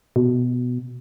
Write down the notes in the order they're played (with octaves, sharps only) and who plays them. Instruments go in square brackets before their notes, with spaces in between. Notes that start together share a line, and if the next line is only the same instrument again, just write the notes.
[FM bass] B2